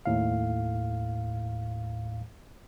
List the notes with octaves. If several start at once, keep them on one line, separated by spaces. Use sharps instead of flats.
D#2 A2 F5